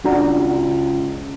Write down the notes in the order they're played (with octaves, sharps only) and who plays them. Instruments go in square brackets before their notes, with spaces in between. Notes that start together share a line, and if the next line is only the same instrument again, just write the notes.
[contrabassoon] C#2 [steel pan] D4 F#4 A#5